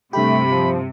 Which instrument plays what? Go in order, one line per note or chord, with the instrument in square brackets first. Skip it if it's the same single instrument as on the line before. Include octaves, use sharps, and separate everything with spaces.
[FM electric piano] G2 G4 [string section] C3 [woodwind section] A3 [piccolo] B5
[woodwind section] F3